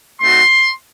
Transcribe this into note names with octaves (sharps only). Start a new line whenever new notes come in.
A3 C4 D#4 F#4 C6